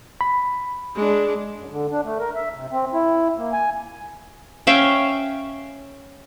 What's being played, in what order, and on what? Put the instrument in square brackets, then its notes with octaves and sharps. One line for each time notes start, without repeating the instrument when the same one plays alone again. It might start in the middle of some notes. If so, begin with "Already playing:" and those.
[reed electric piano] B5
[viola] G#3 D4
[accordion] F#2
D3
D4
A3
A#4
E5
C3
C4
E4
A#3
G#5
[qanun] C#4 E5 F5 G5